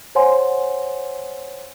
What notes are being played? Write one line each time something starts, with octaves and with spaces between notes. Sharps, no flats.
C5 C#5 F#5 G#5 C6